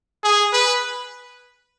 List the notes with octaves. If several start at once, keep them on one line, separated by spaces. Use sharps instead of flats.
G#4
B4